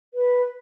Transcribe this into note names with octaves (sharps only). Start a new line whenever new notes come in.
B4